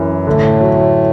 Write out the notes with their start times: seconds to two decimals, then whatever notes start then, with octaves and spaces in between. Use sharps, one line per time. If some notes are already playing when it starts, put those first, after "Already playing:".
Already playing: F#2 E3
0.26 A2 D3 A3
0.61 F#3